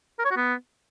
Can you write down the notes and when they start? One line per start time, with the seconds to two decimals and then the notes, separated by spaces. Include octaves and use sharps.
0.19 A#4
0.25 C#5
0.31 F#4
0.37 B3